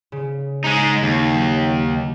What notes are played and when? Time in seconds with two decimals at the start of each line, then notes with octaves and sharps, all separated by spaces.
0.12 C#3
0.64 G#3 D#4
1.03 D#2
1.35 F#3